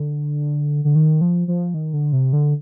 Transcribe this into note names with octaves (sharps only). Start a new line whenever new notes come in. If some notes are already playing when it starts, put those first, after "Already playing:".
Already playing: D3
D3
D#3
F3
F3
D#3
D3
C3
D3